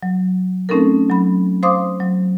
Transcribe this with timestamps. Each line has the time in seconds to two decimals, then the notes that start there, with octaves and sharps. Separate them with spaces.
0.03 F#3
0.69 A3 C4 C#4 D#4 A4 A#4
1.10 F#3 B5
1.63 C5 F5 C6 D6 D#6
2.00 F#3